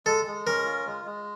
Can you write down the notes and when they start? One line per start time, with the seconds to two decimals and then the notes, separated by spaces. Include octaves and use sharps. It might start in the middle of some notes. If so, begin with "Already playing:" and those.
0.06 G#3 A4
0.26 G#3
0.47 C#4 A#4
0.66 F4
0.86 G#3
1.05 G#3